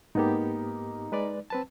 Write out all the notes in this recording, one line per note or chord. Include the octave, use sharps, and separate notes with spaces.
G#2 A#3 B3 D#4 G4
G#3 B4 D5
C4 B4 A5